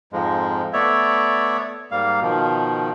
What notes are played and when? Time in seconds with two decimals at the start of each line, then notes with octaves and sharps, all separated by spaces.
0.13 F2 G#2 F3 G#3
0.73 A3 B3 C#5 D5 E5
1.91 G#2 G3 A#3 F5
2.21 B2 D#3 F3